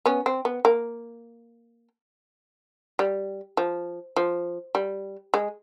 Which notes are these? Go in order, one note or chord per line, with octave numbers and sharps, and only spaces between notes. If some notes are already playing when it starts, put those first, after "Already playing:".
B3 C#4
C4
B3
A#3
G3
F3
F3
G3
G#3